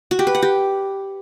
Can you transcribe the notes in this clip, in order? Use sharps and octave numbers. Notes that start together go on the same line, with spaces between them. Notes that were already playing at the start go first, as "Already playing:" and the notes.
F#4
G4
B4
F#5
G4